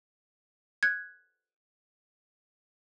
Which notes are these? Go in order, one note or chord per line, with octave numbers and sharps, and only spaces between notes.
F#6 G#6